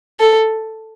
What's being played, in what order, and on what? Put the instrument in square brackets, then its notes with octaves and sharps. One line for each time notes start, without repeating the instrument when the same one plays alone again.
[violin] A4